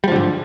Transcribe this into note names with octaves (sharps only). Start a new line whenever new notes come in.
G#2 D3 F3 G3